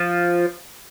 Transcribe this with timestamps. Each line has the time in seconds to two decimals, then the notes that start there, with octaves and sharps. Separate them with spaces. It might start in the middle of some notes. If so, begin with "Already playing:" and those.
Already playing: F3